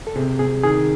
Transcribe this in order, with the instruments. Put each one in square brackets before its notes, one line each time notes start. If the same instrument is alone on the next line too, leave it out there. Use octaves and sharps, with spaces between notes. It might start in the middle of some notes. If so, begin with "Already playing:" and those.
[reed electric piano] A4
[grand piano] C3 [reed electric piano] G#4
[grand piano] C3 [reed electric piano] G#4
[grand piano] D#3 [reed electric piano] G#4